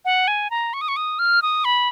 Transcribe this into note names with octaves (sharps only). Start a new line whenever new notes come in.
F#5
G#5
A#5
C#6
D#6
C#6
D#6
F6
D#6
B5